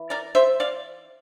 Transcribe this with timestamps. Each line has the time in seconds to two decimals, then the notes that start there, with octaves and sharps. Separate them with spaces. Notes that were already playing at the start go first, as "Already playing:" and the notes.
Already playing: E3
0.10 A#4 D5
0.35 C5 E5
0.60 D5 F5